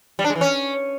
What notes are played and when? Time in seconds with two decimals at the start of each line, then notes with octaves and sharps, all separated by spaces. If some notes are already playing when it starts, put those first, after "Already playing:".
0.19 G3
0.24 D4
0.30 G#3
0.35 E3
0.41 C#4